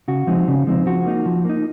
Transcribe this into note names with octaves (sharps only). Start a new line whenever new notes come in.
C#3 F#4
F3 G#3 C4 D#4
C#3
F3 G#3 C4 D#4
F3 F#4
A#3 D#4
F3
A#3 D#4